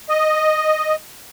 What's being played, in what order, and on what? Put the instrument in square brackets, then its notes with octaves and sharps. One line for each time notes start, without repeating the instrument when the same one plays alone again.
[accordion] D#5